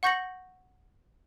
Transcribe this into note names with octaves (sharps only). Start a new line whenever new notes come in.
F#5 C#6 G6 A#6 C#7 F#7